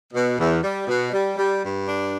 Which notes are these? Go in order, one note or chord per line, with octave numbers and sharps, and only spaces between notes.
B2
E2
G3
B2
G3
G3
G2
D4